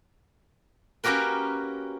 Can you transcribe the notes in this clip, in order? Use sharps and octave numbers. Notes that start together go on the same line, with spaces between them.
A#3 C#4 F#4 G4 A#4 B4